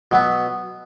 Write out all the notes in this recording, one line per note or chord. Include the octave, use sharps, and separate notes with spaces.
B2 F#3 B3